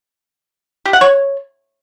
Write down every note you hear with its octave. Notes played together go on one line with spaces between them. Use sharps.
G4
F#5
C#5